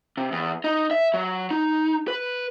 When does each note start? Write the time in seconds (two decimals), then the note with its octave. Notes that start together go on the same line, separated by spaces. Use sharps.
0.17 C3
0.32 E2
0.64 D#4
0.91 E5
1.14 F#3
1.51 D#4
2.08 B4